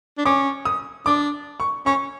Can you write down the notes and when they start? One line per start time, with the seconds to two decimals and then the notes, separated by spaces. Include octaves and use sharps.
0.18 D4
0.25 C#4 D6
0.65 D#6
1.06 D4 D6
1.60 C#6
1.86 C#4 C#6